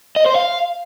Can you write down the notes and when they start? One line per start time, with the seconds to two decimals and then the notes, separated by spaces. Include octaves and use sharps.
0.16 D#5
0.26 C5
0.36 F5